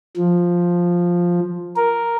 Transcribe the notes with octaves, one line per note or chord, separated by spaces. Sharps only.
F3
A#4